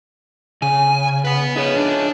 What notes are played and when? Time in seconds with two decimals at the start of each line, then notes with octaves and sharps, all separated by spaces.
0.62 C#3 G#5
1.25 B4 F#5
1.56 D#4 G#4 C#5
1.77 D4